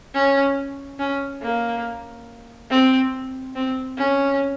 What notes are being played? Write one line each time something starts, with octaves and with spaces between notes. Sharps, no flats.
C#4
C#4
A#3
C4
C4
C#4